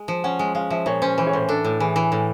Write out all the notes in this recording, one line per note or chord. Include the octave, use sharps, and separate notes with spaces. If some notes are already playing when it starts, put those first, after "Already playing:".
Already playing: G#3
F3
C#4 F#5
G#3
G#3 F5
F3 E5
A#2 C#5
C#4 C5
E3 C5
C#5
A2 C5
D4 A4
A2
E3 G#4
E3
A2